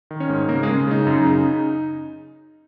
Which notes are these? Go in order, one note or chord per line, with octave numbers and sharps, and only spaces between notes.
D#3
C#4 C#5
G#2
C#3 A#3 A#4
G#3 G#4
C#3
C#3 D#4
F#2
C#3